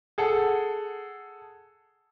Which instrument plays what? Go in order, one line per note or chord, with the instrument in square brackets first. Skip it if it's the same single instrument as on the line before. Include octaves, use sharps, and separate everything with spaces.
[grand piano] G#4 A4 F#5